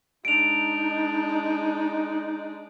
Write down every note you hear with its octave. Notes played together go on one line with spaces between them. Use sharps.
G#3 D4 D#4 D7 F7